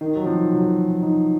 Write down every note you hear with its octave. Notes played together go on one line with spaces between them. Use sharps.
D#3 D#4
F#3
F3 C4
C3 F#3
F3
D#4